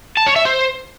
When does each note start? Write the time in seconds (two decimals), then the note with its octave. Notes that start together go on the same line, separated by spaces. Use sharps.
0.17 A5
0.26 C#5
0.36 E5
0.45 C5